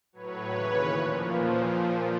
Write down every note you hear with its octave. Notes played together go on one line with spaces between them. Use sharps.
A2 F#3 B4 C#5
D#2 C#3 E3
A#2 F3